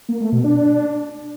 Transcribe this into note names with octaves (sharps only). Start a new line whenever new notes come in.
A#3
A3
B2
D4